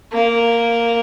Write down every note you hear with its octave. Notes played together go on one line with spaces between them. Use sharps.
A#3